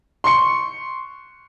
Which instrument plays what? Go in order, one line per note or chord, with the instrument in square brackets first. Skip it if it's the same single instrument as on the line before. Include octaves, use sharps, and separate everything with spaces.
[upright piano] C6 C#6 C#7